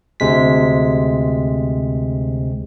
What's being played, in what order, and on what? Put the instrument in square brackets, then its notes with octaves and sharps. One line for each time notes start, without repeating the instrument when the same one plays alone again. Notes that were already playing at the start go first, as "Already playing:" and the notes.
[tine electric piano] D2 C3 G#3 B6